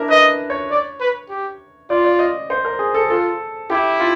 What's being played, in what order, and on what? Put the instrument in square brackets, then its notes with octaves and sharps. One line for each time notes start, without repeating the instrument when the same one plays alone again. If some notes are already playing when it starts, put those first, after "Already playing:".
Already playing: [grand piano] D4 E4 A#4
[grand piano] B4 [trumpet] D#5
[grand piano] C#5
[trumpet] D5
B4
G4
[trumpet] F4 [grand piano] D5
[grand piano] D5
D#5
C5
A#4
G#4
A4
[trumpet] F4 [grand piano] A4
[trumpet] E4 [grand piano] G4
[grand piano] F4